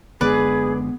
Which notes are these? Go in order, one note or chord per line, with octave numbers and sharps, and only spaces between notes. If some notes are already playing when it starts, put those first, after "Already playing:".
F#1 D3 G#3 B3 G#4 B4 D5